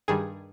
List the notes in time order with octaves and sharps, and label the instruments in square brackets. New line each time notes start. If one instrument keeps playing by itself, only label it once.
[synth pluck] G2 D#3 G3 G#4